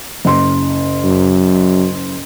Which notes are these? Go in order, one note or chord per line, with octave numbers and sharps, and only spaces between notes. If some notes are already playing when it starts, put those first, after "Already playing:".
F#1 C6
F#2